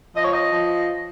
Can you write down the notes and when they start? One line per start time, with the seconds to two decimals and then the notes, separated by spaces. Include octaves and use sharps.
0.16 F3 D#5
0.24 C#5
0.33 D#5
0.52 F3